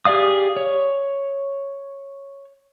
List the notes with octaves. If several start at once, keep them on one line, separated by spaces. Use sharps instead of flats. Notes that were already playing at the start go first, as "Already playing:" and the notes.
G4 G#4 D5 F5 D#6
C#5